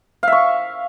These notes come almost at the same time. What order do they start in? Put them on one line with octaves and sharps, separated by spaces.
F5 E5 C#6